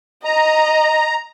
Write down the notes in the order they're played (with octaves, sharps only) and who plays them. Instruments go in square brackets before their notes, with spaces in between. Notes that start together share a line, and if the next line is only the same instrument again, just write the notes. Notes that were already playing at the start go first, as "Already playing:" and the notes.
[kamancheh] D#5 [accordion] A#5